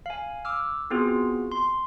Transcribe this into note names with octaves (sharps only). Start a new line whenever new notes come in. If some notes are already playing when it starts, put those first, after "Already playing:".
F5 G#5
D6 E6 F6
B3 C4 F4 F#4 G#4
C6